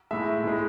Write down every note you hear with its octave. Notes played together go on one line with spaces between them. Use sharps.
A2 G#3 E5
A2 G#3